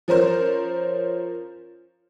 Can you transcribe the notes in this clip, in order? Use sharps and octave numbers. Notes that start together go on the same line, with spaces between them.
F3 C#4 A#4 C5